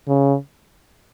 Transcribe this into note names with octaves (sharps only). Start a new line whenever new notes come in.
C#3